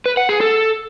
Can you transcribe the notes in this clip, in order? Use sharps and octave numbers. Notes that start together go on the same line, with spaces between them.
B4
F#5
G#4
A4